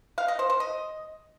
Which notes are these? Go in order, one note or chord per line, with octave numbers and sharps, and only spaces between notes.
F5
D#5
C5
C5
D#5